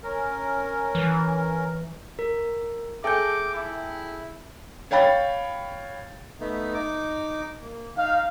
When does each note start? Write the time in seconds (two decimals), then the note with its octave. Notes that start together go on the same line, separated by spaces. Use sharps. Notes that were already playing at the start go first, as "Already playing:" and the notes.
0.03 C#4 A#4
0.95 E3
2.19 A#4
3.04 G#4 A4 E5 G5 D6 G6
3.54 E4
4.91 C#5 F5 G5 B5 A6
6.40 A3 B3 D#4
6.74 D#4 D6
7.61 A#3
7.96 D#4 F5